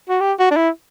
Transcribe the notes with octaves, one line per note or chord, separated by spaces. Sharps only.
F#4
G4
F#4
D4
E4